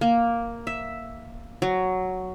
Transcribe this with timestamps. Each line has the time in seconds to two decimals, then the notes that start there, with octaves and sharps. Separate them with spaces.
0.01 A#3
0.67 E5
1.62 F#3